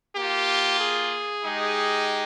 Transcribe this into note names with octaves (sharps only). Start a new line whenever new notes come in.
A#3 F4 G4
G#4
G#3 D#4 G4